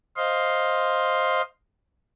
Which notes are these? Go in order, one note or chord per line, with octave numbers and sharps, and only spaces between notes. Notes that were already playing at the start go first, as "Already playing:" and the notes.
C5 D#5 F5 C6